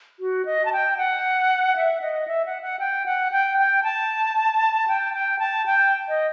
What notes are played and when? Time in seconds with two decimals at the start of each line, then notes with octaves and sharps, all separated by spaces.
0.20 F#4
0.45 D#5
0.65 A5
0.73 G5
0.97 F#5
1.77 E5
2.01 D#5
2.28 E5
2.46 F#5
2.62 F#5
2.79 G5
3.06 F#5
3.32 G5
3.58 G5
3.83 A5
4.88 G5
5.13 G5
5.39 A5
5.66 G5
6.09 D#5